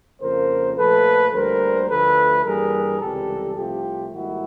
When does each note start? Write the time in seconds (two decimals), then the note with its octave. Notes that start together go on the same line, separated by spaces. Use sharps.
0.21 F2 C#3 F3 A#3 A#4 C5
0.77 A#2 F3 A3 A4 B4
1.33 D2 D3 G3 A#3 A#4 C5
1.89 D2 D3 F3 A3 A4 B4
2.45 G2 E3 G3 A#3 G#4 A#4
3.00 C#2 C3 E3 G3 G4 A4
3.56 C2 C3 F3 A3 F4 G4
4.12 G#2 D#3 G3 A#3 E4 F#4